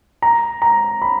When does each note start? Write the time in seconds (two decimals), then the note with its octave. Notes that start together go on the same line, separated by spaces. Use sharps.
0.22 A#5
0.62 A#5
1.02 B5